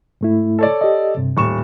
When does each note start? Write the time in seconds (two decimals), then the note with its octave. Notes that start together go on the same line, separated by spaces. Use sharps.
0.21 G#2 A3 E4
0.59 A4 C#5 D5
0.81 G4 D#5
1.17 G2 C3
1.37 D#1 A2 C#6 E7